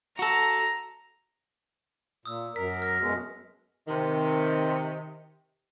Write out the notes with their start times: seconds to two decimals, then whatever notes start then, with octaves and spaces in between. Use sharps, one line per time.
0.19 F#4 A4 A#5
2.25 A#2 D#6 E6
2.56 F#2 A#4 B6
2.82 F6 A#6 B6
3.00 F#2 B2 G#3
3.88 C3 D#3